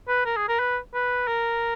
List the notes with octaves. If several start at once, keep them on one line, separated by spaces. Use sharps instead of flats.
B4
A#4
G#4
A#4
B4
B4
A#4